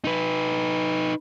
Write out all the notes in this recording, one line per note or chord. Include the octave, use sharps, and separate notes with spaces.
D#4 B4